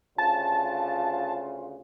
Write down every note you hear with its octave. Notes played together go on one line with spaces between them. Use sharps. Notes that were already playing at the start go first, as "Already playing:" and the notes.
D2 C#3 F4 A5